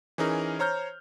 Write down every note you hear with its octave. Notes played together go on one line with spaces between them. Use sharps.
E3 C#4 D#4 G#4 A#4
C5 C#5 A#5 F6 G6